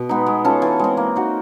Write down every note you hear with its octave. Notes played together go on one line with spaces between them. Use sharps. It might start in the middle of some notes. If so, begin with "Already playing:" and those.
Already playing: B2
G#3 B3 D#4
G#3
C#4 F4 A4
E3
G#3 C4
A#3
D#4 F#4